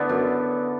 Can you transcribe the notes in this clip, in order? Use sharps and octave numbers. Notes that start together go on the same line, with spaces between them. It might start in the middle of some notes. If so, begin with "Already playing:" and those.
Already playing: D3 B3 E4
F#2